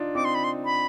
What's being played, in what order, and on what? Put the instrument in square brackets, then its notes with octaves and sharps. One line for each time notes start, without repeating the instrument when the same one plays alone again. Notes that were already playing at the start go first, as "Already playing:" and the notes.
Already playing: [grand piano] D4 D#4 F4
[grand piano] C4 D#4 [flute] D6
[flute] C6
B5
C6
B5